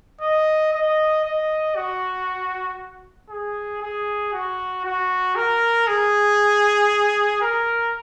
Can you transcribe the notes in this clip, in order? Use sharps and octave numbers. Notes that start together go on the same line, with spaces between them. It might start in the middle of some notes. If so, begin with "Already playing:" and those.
D#5
D#5
D#5
F#4
G#4
G#4
F#4
F#4
A#4
G#4
A#4